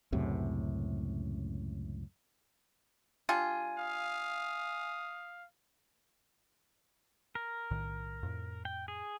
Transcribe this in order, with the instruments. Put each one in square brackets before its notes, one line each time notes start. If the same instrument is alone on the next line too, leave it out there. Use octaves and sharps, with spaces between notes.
[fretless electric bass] C#2 F#2 A2 C3
[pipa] G3 D4 F4 [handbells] G#5
[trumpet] F5 [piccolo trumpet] D#6
[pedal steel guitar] A#4
[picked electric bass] B1 A2 D#3
F2 A2
[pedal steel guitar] G5
G#4